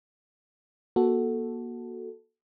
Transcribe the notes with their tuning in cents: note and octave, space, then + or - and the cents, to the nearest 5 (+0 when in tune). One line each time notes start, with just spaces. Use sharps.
A#3 +35 F#4 +0 A4 +0